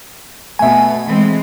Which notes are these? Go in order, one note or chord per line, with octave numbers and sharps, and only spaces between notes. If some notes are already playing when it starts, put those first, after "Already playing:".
B2 A3 E5 G#5
E3 G#3 C4